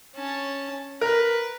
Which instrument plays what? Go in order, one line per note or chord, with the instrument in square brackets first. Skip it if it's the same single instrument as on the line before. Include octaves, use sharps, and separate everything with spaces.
[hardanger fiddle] C#4 A5
[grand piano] A#4 [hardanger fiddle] B4